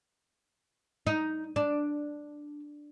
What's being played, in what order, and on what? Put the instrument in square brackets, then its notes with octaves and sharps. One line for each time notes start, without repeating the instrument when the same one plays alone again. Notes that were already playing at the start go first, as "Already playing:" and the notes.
[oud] D#4
D4